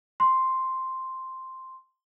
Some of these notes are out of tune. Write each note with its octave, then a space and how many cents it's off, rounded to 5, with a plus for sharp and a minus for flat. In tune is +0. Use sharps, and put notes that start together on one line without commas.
C6 +0